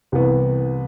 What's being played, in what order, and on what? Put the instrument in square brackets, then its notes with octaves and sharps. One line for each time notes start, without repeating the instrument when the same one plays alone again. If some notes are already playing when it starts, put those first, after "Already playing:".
[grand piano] C2 C3 E3 B3